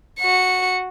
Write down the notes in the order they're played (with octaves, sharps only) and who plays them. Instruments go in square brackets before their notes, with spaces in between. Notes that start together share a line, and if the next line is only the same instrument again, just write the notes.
[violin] F#4 C#7